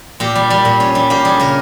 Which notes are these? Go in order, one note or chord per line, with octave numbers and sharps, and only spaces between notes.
A#2 G4
G3
G3
A#2
C#4
G3
A#3 G4
G3 G#4
C#3 A#4